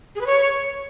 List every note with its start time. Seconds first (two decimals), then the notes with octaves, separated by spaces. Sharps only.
0.16 G#4
0.21 B4
0.26 C#5